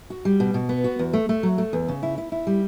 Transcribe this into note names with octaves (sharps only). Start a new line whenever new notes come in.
F#4
G3
B2
B2
B3
F#4
E2
A3
A3
F#3
A3
E2
C#3
E4
E4
E4
G3